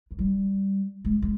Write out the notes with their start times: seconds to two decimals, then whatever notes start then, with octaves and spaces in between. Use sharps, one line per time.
0.11 E3
0.19 G3
1.05 G#3
1.22 G#3